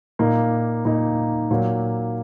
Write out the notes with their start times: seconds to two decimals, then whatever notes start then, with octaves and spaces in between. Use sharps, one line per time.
0.19 A#2 A#3 D#4
0.85 A#2 A#3 D#4
1.51 A#2 F#3 A#3